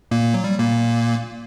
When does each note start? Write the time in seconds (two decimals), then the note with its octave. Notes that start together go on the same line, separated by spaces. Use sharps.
0.11 A#2 A#3
0.34 F#3
0.44 G3
0.59 A#2 A#3